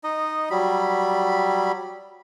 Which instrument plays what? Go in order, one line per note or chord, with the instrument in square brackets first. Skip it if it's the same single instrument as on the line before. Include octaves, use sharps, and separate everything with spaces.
[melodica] D#4 D#5
F#3 G3 B5